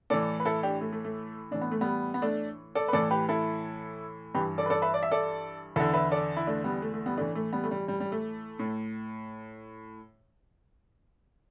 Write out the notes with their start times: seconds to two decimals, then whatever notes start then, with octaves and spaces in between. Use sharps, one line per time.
0.10 A2 E3 A4 D5
0.40 B4
0.45 E4 A4
0.63 D4 G4
0.81 A3
0.92 A3
1.04 A3
1.51 A2 E3 D4
1.61 B3
1.71 A3
1.81 G3 B3
2.14 B3
2.22 A3 D4
2.75 A4 D5
2.88 B4
2.93 A2 E3 A4 D5
3.11 G4 B4
3.29 E4 A4
4.35 G2 E3 G4 B4
4.58 A4 D5
4.66 B4
4.70 A4 D5
4.82 B4 E5
4.94 D5
5.03 E5
5.12 A4 D5
5.76 E2 D3 E4 A4
5.94 B4 E5
6.12 A4 D5
6.37 E4
6.47 A3 D4
6.64 G3 B3
6.82 A3
6.94 A3
7.06 G3 B3
7.17 A2 E3 A3 D4
7.35 A3
7.53 G3 B3
7.64 A3
7.71 G3
7.88 G3
8.00 G3
8.12 A3
8.59 A2